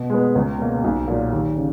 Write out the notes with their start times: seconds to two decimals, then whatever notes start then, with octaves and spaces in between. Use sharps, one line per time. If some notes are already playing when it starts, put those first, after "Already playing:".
Already playing: B2
0.10 G#3 B3
0.35 C#2
0.59 B2 A#3
0.84 B1
1.07 A#2 F#3 A#3
1.32 D#2
1.57 C#3